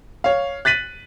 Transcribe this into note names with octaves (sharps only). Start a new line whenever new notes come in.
C#5 F5
F#6 A6 B6 D#7 F#7